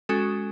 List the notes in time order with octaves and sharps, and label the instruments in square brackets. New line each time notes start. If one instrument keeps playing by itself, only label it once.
[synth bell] G#3 C#4 F#4 A4